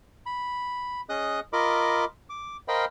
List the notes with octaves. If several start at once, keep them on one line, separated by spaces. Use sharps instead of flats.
B5
C#4 G#4 D#5 D#6 F#6
F4 A#4 D#5 B5 D6
D6
A#4 C5 D#5 F5 G5 B5